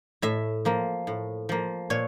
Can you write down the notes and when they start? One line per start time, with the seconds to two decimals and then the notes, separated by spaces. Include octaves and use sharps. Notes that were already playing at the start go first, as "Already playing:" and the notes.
0.22 A2 E5
0.65 F3 A#3
1.07 A2
1.49 F3 A#3
1.90 A#2 C#5